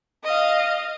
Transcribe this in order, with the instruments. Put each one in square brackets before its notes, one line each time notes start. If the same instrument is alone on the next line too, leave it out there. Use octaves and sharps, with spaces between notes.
[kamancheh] D#5 F5